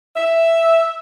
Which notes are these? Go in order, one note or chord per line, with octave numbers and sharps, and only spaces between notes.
E5